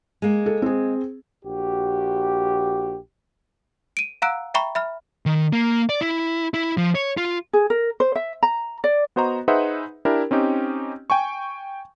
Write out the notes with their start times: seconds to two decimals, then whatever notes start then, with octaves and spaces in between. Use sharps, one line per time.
0.22 G#3 A#3
0.46 A4
0.62 C4 G#4
1.43 A#1 F#4 G4
3.97 D7 D#7
4.22 F5 F#5 A#5 E6 F#6 D7
4.54 E5 G5 A#5 B5 C#6
4.75 E5 B5 F6
5.26 D#3
5.53 A#3
5.89 D5
6.01 E4
6.54 E4
6.77 F3
6.95 C#5
7.17 F4
7.53 G#4
7.70 A#4
8.00 C5
8.15 E5
8.43 A#5
8.84 D5
9.16 B3 F#4 C5 D#5 A#5
9.48 D#4 G#4 B4 C5 E5 F#5
10.05 D4 E4 G4 A#4
10.31 C4 C#4 D#4 G4
11.10 G5 G#5 C#6